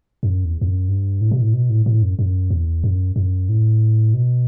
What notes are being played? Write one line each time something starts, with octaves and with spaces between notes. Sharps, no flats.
F#2
E2
E2
F#2
G2
A2
B2
A2
B2
A2
A2
F#2
F#2
E2
F#2
F#2
A2
B2